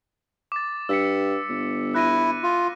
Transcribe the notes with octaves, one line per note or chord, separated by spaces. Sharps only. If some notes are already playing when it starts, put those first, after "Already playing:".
D6 A6
G2 E6 B6 C#7
G1
E4 F#6 A#6 D#7
F4